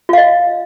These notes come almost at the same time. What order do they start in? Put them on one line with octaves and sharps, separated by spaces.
F4 F5 D#5